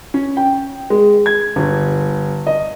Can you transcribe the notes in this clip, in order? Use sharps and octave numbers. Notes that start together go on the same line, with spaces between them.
C#4
G5
G#3
G#6
G1
D#5